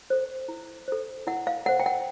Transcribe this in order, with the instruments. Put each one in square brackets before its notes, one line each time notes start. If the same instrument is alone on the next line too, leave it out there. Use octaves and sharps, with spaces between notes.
[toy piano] A4 C5
E4
A4 C5
E4 F#5
F5
A4 C5 F#5
G5
F#5